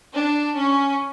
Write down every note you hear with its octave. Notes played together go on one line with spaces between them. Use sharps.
D4
C#4